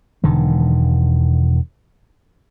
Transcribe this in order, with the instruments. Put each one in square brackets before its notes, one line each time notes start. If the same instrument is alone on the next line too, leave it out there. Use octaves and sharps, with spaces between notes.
[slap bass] E1 D3 D#3